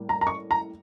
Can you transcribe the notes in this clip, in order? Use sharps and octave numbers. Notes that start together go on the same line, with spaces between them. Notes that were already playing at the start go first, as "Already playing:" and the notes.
Already playing: A2 G3 A#3
A#5
A#5
C#6
A#5